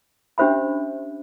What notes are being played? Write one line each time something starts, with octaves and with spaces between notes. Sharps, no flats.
C#4 D4 G4 C5 E5 B5